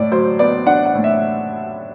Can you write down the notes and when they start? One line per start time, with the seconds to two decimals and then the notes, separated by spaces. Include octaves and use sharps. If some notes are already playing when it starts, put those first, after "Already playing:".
Already playing: A2 D5
0.11 F#3 C5
0.39 B3 D5
0.66 D4 F#5
0.85 F#5
0.95 A2
1.04 E5